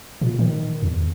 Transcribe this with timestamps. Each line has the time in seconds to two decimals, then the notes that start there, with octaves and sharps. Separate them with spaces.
0.21 A#2
0.39 D#3
0.82 E2